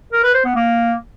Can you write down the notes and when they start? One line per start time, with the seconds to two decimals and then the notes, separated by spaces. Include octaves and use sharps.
0.13 A#4
0.23 B4
0.34 C5
0.45 B3
0.56 A#3